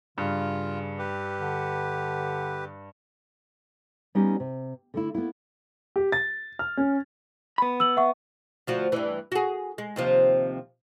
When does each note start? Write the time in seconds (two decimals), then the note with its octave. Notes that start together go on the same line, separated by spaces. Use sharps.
0.18 G2 C#3 F4
0.99 G4 B4
1.40 D3
4.15 G3 B3 C#4 D#4 G4
4.40 C3
4.94 D3 A3 E4
5.15 A#3 B3 E4
5.96 G4
6.12 A6
6.59 F6
6.77 C#4
7.58 B3 B5
7.80 E6 F#7
7.97 E5 F#5 C#6
8.67 D2 F3 F#4
8.92 G2 E3
9.32 F#4 G#4
9.78 G#3
9.96 D#2 C3 F3